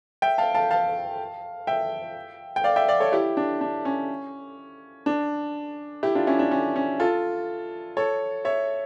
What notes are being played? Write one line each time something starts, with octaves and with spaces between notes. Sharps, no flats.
E5 G5
F5 A5
F5 A5
F5 A5
E5 G5
G5
D5 F5
E5 G5
D5 F5
A4 C#5
E4 G4
D4
D4
C#4
D4
E4 G4
D4 F4
C#4 E4
D4
C#4
C#4
F4 A4
A4 C#5
C#5 E5